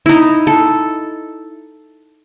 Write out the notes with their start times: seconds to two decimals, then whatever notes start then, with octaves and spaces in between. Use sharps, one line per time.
0.06 D#4 E4
0.47 A4